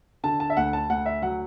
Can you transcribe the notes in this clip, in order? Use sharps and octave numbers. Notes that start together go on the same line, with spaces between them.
D3 A5
A5
E5
D2 F#5
A5
D2 F#5
E5
F#3 F#5